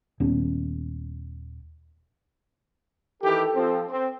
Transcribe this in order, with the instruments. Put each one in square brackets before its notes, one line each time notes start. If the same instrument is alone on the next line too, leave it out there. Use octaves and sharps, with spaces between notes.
[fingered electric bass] D#1 B3 C#4
[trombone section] D#3 E3 G4 [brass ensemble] A4
[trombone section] F3 C4
C4